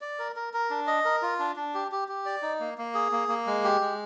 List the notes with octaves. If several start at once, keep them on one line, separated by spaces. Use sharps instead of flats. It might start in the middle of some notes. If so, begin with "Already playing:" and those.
D5
A#4
A#4
A#4
D4
D#5
A#4
F4
D4
D4
G4
G4
G4
D5
D#4
A#3
A#3
G#4
A#3
A#3
G#3
G4
G#3